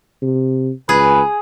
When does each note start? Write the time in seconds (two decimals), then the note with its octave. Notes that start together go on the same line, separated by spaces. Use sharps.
0.22 C3
0.89 C#2 G#4 B4